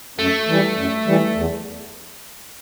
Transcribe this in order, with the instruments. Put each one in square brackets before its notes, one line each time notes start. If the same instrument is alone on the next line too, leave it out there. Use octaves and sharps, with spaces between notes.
[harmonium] F#2 [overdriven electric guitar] A3
[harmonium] E3 G3
F#2
E3 G3
E2